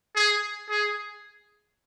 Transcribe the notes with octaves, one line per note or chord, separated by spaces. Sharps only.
G#4
G#4